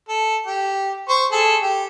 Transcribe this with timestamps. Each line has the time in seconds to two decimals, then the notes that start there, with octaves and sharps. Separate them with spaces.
0.09 A4
0.47 G4
1.09 C5 C#6
1.32 G#4 A4
1.62 G4